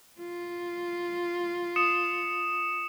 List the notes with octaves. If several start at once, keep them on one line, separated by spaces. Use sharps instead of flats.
F4
D#6 C#7 E7